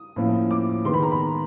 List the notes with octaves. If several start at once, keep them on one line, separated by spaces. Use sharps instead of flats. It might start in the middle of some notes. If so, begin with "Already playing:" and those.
Already playing: D#6
A2 F3 A#3 C#4
D6
D#3 G#3 B3 C6
B5
A#5
B5